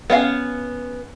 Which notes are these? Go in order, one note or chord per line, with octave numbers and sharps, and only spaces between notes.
B3 C#4 F5